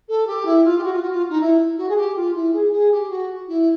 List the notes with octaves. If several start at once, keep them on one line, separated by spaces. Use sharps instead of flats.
A4
G4
E4
F4
G4
F#4
F4
F#4
F4
D#4
E4
F#4
G#4
G4
F4
E4
G#4
G#4
G4
F#4
E4